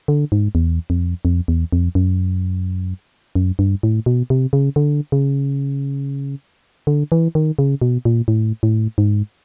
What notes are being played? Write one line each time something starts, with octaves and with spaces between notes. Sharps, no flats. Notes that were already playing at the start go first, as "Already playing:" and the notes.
D3
G#2
E2
F2
F2
E2
F2
F#2
F#2
G2
A2
B2
C3
C#3
D3
C#3
D3
E3
D#3
C#3
B2
A#2
A2
A2
G#2